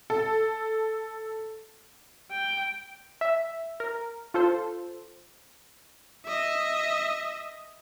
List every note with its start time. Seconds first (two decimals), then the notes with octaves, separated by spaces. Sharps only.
0.10 A4
2.31 G5
3.21 E5
3.80 A#4
4.34 F4 A4 C5
6.25 D#5 E5